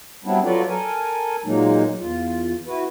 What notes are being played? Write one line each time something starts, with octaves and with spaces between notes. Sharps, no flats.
F#3 G3 B3 C4 D4 E4
F#3 F4 F#4 A4 B4 D5
A4 A#4 G#5
A#2 F#3 G#3 A#3 D#4
E2 F4
E4 F#4 B4